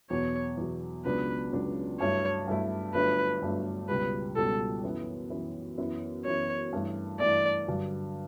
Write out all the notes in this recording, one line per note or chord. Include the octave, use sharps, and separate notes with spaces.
E2 B2 F#3 C#5
E2 B2 F#3
C#2 C#3 F#3 B3 D4 B4
C#2 C#3 F#3 B3 D4
G2 F#3 A3 E4 C#5
G2 F#3 A3 E4
G1 G2 F#3 A3 D4 B4
G1 G2 F#3 A3 D4
C#2 B2 G3 B4
C#2 B2 G3 A4
F#2 E3 B3 E4
F#2 E3 B3 E4
F#2 E3 B3 E4
F#2 E3 B3 E4 C#5
G2 E3 A3
G2 E3 A3 D5
G2 D3 F#3